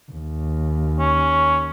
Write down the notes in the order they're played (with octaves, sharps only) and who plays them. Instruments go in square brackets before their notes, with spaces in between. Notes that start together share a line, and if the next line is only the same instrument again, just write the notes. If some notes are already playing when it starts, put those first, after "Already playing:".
[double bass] D#2
[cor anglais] C#4